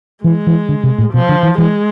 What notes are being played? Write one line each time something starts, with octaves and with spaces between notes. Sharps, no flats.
E3 G#3
E3
D3
C3
A2
B2 F3
D3
E3
E3 G#3